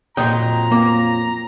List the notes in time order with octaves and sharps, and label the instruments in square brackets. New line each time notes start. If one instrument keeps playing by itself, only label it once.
[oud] F2 A#2 F#3 [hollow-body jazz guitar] D#5 G5 [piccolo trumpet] A#5
[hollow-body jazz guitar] A#3